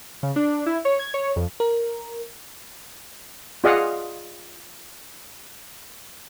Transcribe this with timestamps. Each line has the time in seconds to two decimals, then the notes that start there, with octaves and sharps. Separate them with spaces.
0.23 C#3
0.36 D4
0.66 E4
0.85 C#5
0.99 G#6
1.14 C#5
1.36 F2
1.60 A#4
3.64 F4 G#4 D5 D#5 F5 F#5